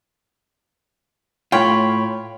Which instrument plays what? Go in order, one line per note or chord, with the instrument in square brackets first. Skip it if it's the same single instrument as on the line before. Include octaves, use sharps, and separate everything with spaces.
[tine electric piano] A2 C#5 B5 [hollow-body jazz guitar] F4 [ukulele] G5